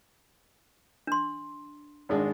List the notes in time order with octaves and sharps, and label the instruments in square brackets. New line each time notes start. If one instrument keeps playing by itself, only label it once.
[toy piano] D4 C6
[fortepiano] G#1 G#3 D4